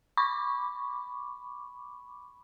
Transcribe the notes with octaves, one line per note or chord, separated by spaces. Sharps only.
B5 C#6 D6